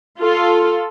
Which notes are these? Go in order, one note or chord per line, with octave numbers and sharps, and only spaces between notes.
F4 A4